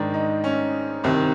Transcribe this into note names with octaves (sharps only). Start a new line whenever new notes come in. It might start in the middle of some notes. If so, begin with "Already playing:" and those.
Already playing: G#2 D#3 D4
D#4
C#4
C2 C3 D#3